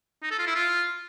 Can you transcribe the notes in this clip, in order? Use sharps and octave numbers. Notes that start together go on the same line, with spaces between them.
D#4
A4
F4
E4
F4